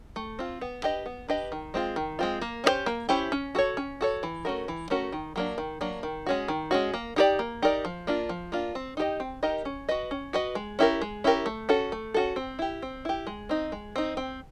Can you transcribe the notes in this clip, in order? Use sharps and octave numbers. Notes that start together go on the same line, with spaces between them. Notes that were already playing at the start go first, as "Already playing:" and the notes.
A3
C4 F4
B3
D4 G4 B4 D#5
B3
D4 G4 B4 D#5
D#3
G#3 C4 F4
D#3
G#3 C4 F4
A#3
C#4 E4 G4 C5
A#3
C#4 E4 G4 C5
C#4
F#4 A4 C#5
C#4
F#4 A4 C#5
E3
A3 C#4 F#4 A#4
E3
A3 C#4 F#4 A#4
D#3
F#3 A#3 D4
D#3
F#3 A#3 D4
D#3
G#3 C#4 F#4
D#3
G#3 C#4 F#4
A#3
D#4 G4 A#4 D5
A#3
D#4 G4 A#4 D5
F3
A#3 D4 F4
F3
A#3 D4 F4
C4
D#4 G4 A#4 D#5
C4
D#4 G4 A#4 D#5
C#4
F#4 B4 D#5
C#4
F#4 B4 D#5
G#3
C#4 E4 G4 A#4
G#3
C#4 E4 G4 A#4
A3
C#4 F#4 A4
A3
C#4 F#4 A4
C4
E4 G4
C4
E4 G4
G#3
C4 D#4
G#3
C4 D#4
C4